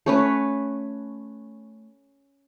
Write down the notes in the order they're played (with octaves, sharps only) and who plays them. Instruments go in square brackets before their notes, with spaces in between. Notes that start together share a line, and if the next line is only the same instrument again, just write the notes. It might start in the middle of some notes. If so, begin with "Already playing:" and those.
[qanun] A3 C#4 B4